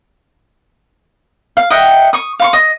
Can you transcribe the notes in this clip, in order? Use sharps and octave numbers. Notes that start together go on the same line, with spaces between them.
F5
D#5 E5 F#5 G5
C#6 D#6
F5 C6 C#6
D#5